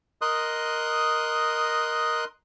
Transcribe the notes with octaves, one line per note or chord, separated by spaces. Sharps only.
A#4 D#5 C6 D#6 F#6